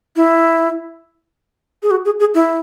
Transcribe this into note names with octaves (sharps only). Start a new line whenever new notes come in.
E4
G#4
F#4
G#4
G#4
E4